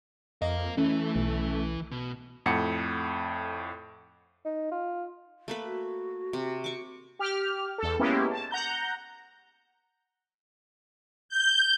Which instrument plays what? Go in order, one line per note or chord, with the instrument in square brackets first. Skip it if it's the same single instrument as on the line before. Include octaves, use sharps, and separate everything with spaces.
[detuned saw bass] F2 [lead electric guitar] A#4 F5 [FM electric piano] D#5
[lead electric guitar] E3 E4 [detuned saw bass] A3 [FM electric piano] C#4
[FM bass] B1
[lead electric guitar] B2
[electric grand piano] F2 A2 F#5 C#7
[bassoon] D#4
F4
[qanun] A3 A#3 B4
[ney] F#4
[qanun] C3
C#6 D6
[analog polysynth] G4 F6
E2 A4
G#3 A#3 B3 C#4 E4 G4
A5
F#5 A#5 G6
[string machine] G6